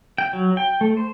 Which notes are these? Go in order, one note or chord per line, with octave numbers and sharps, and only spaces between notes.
G5
F#3
G5
A3
C5